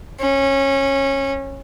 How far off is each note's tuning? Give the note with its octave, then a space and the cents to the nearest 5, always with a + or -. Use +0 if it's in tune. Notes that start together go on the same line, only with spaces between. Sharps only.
C#4 -20